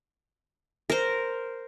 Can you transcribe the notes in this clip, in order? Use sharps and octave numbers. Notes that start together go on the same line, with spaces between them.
A#4 C5